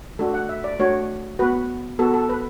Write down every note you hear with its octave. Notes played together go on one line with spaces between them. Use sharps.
A3 D4 F#4 A4
F#5
E5
D5
A3 D4 F#4 C#5
B3 F#4 B4
B3 F#4 A4
A4
B4